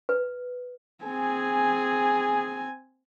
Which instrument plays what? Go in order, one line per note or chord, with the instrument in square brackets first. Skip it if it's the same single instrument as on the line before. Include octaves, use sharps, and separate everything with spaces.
[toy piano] B4
[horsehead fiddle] C4 G#5 [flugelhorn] G#4